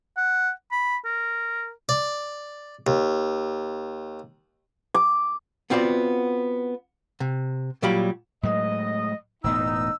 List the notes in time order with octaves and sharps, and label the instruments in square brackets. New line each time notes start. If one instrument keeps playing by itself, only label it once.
[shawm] F#5
B5
A#4
[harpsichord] D5
D#2
[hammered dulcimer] D6
[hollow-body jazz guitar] B3 C4 F4 F#4 D5
C3
A#2 F#3 G3 G4 F5 B5
[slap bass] A2 F#3 G#3 [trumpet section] D#5
[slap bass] E1 A2 B3 [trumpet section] D#4 [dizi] E6